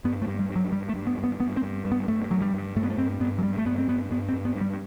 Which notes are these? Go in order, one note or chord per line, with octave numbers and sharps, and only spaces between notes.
G2 B3
A3
G2
G3
G2
F#3
G2 G3
A3
G2
B3
G2
B3
G2 B3
C4
G2
G2
B3
G2 A3
G2 F#3
G3
G2
G2 A3
B3
A3
G2 C4
G2 B3
F#3
G2 G3
A3
G2 B3
C4
G2 B3
G2 B3
C4
G2
B3
G2
G3